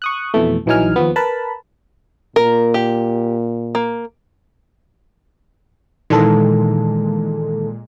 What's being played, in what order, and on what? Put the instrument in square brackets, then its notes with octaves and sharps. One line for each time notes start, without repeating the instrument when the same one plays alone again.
[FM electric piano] C#6 D#6 F#6
F2 B2 E3 A3
A#1 E3 F#3 D#4 G#5 F6
D#2 F3 B3
A#4 B4 A5 B5
[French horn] A#2 [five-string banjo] A#4
[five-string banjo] G4
A#3
[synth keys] A#2 G#3 [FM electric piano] D#3 E3 A4